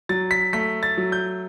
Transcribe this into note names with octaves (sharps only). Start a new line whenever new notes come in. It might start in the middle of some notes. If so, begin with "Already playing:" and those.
F#3 A6
B6
A3 B6
A6
F#3
G6